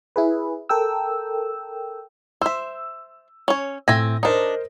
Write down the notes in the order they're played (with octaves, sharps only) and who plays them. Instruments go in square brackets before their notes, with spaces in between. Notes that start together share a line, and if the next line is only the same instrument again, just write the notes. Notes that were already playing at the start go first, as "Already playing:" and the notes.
[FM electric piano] E4 G#4 B4
A4 A#4 G5 E6
[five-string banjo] C5 E5 [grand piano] E6
[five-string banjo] C#4 C#5
[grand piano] A2 A#6 [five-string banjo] C4 E5 G#5
[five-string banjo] D4 D#4 [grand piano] A#4 C5 D#5